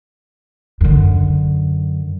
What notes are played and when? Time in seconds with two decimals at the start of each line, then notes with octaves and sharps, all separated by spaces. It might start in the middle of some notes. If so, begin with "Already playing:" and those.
0.81 F#2 D3